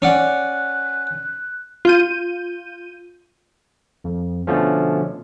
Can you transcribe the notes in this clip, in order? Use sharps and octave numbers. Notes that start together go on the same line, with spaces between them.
C#4 D5 F#5 F#6
F4 G6 D#7
F2
B2 D3 F3 A3 C#4